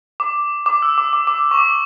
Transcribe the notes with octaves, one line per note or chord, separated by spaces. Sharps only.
D6
D6
E6
D6
D6
D6
C#6
D6